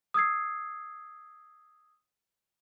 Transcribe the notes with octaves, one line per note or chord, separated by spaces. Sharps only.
D#6 E6 G#6 C7